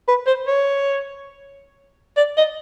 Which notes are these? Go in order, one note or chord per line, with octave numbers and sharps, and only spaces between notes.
B4
C5
C#5
D5
D#5